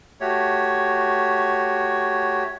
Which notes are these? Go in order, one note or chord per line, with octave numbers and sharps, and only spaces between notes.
A3 F#4 G4 C#5